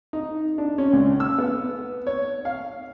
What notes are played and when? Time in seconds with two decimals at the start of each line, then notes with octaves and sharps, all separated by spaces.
0.13 D#4
0.58 D4
0.78 C#4
0.93 C#2
1.20 E6
1.38 B3
2.07 C#5
2.45 F5